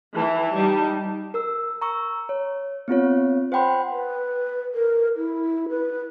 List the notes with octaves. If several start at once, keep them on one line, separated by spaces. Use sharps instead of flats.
E3 A5
G3 D#4
A#4 E6
A#5 C#6 E6
C#5
B3 C4 F4 C#5
C5 F#5 G5 B5 C6
B4
A#4
E4
B4